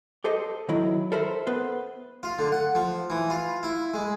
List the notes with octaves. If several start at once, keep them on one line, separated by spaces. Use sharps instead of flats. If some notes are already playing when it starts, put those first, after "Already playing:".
G4 A4 C5 D#5
D#3 F#3 E4
A4 A#4 C5 E5 B5
B3 B4 C5
F4
D3
F#5
F3
E3
F4
E4
G#3